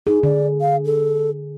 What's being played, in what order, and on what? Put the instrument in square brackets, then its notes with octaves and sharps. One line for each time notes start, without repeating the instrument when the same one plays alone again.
[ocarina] D#4 [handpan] G#4
[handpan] D3 [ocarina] D5
[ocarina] F5
A4